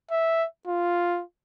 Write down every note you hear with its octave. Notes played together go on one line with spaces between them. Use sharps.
E5
F4